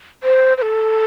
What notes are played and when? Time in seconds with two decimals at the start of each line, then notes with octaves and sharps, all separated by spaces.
0.23 C5
0.57 C5
0.62 A4